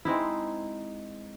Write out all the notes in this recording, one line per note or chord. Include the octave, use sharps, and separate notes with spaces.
G#3 C4 D#4 E4